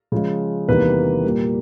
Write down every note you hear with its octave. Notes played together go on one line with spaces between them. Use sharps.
C#3 F3 G#3
E2 C3 D#3 G3 A#3 B4
A#2 G3 A#3